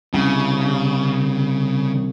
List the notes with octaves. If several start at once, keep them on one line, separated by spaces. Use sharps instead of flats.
C2 C#3